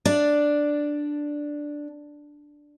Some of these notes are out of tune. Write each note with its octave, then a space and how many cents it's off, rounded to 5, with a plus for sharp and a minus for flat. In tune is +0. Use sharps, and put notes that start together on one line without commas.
D4 +0 D5 +0